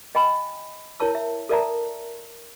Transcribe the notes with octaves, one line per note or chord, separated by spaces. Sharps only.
D#5 G5 G#5 B5
E4 A#4 C#5 A5 E6
E5
A4 A#4 D5 E5 A5 A#5